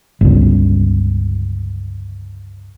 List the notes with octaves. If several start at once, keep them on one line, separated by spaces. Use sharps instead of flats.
G1 C#2